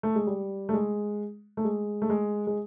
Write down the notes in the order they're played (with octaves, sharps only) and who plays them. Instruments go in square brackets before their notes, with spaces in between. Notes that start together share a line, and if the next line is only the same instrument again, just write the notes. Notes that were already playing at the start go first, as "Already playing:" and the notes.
[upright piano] A3
G#3
G3
A3
G#3
A3
G#3
A3
G#3
G#3